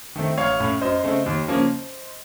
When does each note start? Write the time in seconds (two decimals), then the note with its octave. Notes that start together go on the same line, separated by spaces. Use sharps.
0.16 D#3 A3 C4
0.38 A1 C#5 F5
0.60 A2 A3 C#4
0.81 F#2 C5 D#5
1.03 C#3 A3 C4
1.26 D#2
1.48 C#3 F3 A#3 C#4